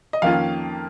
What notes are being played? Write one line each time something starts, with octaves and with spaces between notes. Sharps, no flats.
D#5
F2 D#3 A#3 C#4 F4 F5